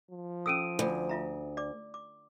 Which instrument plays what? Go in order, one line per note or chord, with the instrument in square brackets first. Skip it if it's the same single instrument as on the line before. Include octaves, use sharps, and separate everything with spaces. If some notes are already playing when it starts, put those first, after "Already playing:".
[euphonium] F3
[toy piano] C#4 A4 E6 [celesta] D#6 D7 D#7
[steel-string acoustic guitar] D2 [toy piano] B5
[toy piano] F4 E5 A#5
D5 D6
D6